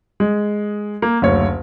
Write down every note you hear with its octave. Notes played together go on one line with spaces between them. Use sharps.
G#3
A#3
F#1 D2 C#5